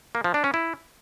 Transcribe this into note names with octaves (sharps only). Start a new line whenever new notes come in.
A#3
F3
D4
C#4
E4